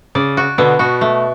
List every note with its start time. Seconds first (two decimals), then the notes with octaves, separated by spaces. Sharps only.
0.15 C#3 D5
0.37 F#4
0.58 B2 D3 B3
0.79 B2 F#4
1.01 A3